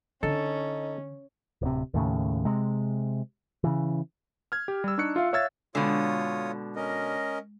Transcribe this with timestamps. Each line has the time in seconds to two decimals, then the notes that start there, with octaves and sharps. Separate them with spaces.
0.23 D3 C#4 D#4 A4
1.62 D1 C3
1.94 D#2 A2 C#3
2.45 C3 G#3
3.64 C#3 E3
4.52 F6 G#6
4.68 G4
4.84 G3 E6
4.98 D4 D#4 C#6 F#6 C#7
5.16 F4 E5 F5
5.33 C#5 E5 F5 E6 G#6 A6
5.75 B2 D3 G#3 F4 C#5 D#6
6.76 C#4 A#4 D#5